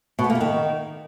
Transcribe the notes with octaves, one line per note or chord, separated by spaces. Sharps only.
B2
B3
A#3
B3
D#3